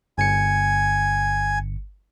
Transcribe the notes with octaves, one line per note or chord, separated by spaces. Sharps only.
G1 G#5 C#7